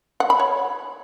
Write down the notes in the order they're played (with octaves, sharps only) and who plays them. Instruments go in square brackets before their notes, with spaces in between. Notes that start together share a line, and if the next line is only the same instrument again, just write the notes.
[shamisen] F#5
B5
C#5